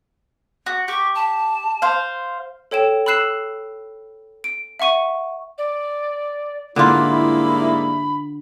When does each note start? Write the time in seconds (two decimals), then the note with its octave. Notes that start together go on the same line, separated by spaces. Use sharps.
0.66 F#4
0.88 G4 C#6
1.15 A5
1.82 C5 F5
2.71 A4 C#5 G5 E7
3.06 B5 E6 F#6 C7 E7
4.44 D7
4.79 E5 F#5 C#6 D#7
5.58 D5
6.76 G#2 D3 G3 A#3 E4 F4 B5